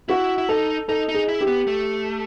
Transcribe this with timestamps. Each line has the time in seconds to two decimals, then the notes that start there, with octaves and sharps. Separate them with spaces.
0.09 E4 F#4
0.38 E4
0.49 D#4 A4
0.88 D#4 A4
1.09 D#4
1.14 G#4
1.28 E4
1.41 G4
1.47 B3
1.67 A3